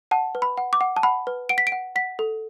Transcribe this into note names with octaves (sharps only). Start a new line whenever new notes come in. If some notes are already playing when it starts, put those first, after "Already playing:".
F#5 A5
B4
B5
F#5
D6
F#5
A5
F#5 B5
B4
F#5 D7
B6
D7
F#5
F#5 B6
A4